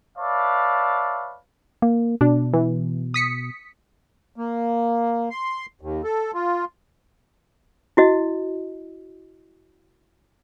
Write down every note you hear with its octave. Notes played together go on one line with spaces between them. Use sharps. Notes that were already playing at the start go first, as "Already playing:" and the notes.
B4 C#5 D5 E5 F5 A5
A#3
B2 D4
E3
D#6 B6 C#7
A#3
C6
D#2
A4
F4
E4 F#4 D#5